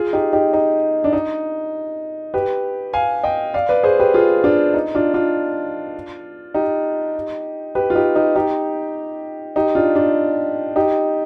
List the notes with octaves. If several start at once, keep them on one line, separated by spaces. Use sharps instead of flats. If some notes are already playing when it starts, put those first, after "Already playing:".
Already playing: F4 G#4
D#4 G4
D#4 G4
D#4
D4
D#4
G4 B4
F5 G#5
D#5 G5
D5 F5
B4 D5
G#4 C5
G4 B4
F4 G#4
D4 F4
D#4
D4 F4
D4 F4
D#4 G4
G4 B4
F4
D#4 G4
D#4 G4
D#4 G4
D#4 G4
D4 F4
D4 F4
D#4 G4